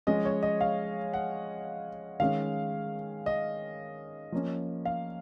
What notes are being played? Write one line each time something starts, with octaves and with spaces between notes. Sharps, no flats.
F3 G#3 C#4 D#5
C#5
D#5
F5
F#5
D#3 G#3 C#4 F5
D#5
F3 A#3 C#4
F5